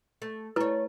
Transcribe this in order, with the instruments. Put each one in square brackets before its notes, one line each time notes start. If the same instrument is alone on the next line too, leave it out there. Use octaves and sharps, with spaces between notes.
[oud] A3
[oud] A3 C#5 [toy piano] E4 B4